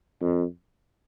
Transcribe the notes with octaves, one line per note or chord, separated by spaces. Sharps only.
F2